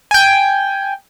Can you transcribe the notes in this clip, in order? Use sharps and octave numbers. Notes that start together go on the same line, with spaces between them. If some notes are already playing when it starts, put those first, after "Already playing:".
G5 G#5